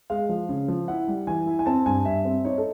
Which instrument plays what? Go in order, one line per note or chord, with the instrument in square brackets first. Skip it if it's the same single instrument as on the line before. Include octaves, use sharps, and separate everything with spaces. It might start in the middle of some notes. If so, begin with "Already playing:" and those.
[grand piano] G#3 F5
F3
C#3
F3
E4 F#5
G3
E3 G#5
E4
G#5
C4 A5
G2 G#5
G2 E5
C4
D#4 C#5
A4